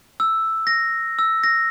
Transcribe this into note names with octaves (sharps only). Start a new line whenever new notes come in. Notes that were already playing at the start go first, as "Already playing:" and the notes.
E6
A#6
E6
A#6